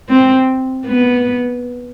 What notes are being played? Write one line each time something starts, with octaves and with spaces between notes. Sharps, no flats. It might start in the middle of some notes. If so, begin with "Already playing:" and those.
C4
B3